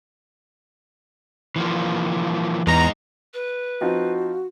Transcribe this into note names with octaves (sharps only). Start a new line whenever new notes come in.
E3 F3 A#3
E2 G#3 D#4 A#5
B4
F3 C4 D#4 F#4